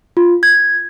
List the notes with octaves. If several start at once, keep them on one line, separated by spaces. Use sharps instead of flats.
F4
G#6